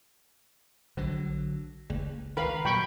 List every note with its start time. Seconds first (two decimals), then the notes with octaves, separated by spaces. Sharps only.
0.97 A#1 D3 F#3
1.90 F#1 C#2
2.37 D#3 A#4 B4 F5 B5
2.65 A#2 F#3 G5 B5 C#6